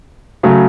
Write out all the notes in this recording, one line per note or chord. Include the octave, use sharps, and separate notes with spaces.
C#3 F#3 A3